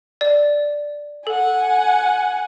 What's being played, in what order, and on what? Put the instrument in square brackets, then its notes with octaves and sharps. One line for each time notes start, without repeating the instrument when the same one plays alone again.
[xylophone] D5
[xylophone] A4 [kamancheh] F#5 G#5